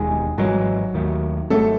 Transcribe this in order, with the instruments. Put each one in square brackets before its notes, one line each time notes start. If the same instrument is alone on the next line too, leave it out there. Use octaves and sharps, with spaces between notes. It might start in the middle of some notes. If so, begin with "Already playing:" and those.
Already playing: [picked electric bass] E1 D#2 D#3 [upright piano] G#3 G#4
[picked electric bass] G#1 G#2 E3 G#3 [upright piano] F#3 F#4
[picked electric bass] D#2 D#3 A3
[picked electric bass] G#1 G#2 F#3 [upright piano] A3 A4